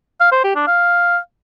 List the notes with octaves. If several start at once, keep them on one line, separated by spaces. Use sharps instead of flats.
F5
C5
G4
D4
F5